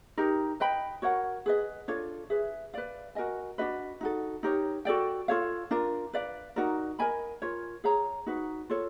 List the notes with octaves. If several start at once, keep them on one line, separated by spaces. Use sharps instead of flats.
D#4 G4 A#4
B4 D#5 G5 B5
F#4 A#4 C#5 F#5
G#4 B4 D#5
D4 F4 A4 C#5
G#4 B4 E5
B4 D5 F5
F#4 A#4 D#5 G#5
D4 F#4 B4 D#5
D#4 F#4 A4
D#4 G4 A#4 C#5
F#4 A4 D5 G5
F4 A4 C#5 F5
D4 F4 A#4
B4 D5 F5
D#4 F#4 A#4 D5
A#4 D#5 G#5 B5
F4 A#4 C#5
G#4 C#5 F5 A#5
D#4 F#4 B4
F4 A4 C#5